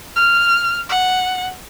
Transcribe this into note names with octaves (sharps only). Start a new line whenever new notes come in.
F6
F#5